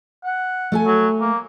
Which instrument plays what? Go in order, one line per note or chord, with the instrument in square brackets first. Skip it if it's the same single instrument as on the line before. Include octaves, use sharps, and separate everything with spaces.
[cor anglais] F#5
[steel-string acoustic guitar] A3 A4 G#5
[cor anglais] F#3
A#3